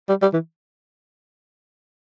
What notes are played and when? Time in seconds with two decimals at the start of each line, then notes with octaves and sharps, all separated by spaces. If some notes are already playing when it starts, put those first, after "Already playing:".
0.09 G3
0.22 G3
0.33 E3